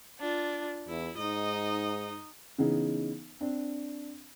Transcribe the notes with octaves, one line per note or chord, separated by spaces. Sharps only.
D4 F4
E2 E4
G#2 D#4 D#5
C#3 E3 B3 D#4 G#4
C4 D4